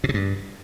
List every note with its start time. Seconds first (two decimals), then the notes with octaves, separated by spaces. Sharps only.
0.04 B2
0.09 C3
0.14 G2